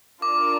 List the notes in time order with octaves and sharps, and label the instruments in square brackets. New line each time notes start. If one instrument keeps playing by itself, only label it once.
[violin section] D4 F4 A#4 D5 F5 [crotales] D6